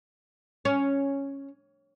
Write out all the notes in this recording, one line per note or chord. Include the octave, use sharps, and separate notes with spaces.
C#4